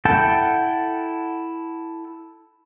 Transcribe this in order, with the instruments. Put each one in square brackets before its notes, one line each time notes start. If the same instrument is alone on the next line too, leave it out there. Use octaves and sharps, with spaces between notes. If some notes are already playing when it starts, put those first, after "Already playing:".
[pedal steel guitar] E4 A4 F#5 G5 A5